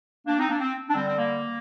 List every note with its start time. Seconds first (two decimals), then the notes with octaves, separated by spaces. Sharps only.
0.27 A#3 D4
0.38 C4 D#4
0.49 A#3 D4
0.60 C4
0.89 D4
0.95 D3 G3 C4
1.06 C4
1.18 A#3